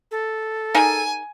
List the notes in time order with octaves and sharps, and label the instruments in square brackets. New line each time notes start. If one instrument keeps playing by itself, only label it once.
[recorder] A4
[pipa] D#4 G#4 A#4 [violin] G#5